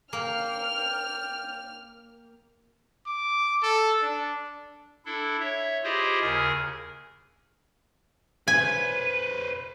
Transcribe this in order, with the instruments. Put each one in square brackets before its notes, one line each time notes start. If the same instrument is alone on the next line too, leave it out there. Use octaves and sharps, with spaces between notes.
[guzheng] A#3 [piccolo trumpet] G5 [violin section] F6
[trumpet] D6
A4
D4
[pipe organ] D4 E4 A4
C#5 E5
E4 F4 G4 G#4 C5 D#5
D#2 C#3 G#4 A#4 G#5
[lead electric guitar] B4 C5 [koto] G#5 [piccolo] D#7